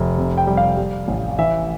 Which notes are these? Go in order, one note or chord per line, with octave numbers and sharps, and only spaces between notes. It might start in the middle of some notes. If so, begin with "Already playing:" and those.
Already playing: F1
C3
G5
G3
F5
G3
A1
E3 E5